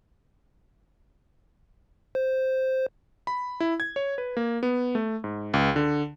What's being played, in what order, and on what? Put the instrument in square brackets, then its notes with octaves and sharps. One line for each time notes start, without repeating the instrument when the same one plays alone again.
[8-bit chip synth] C5
[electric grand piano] B5
E4
G#6
C#5
B4
A#3
B3
A3
G#2
C#2
D3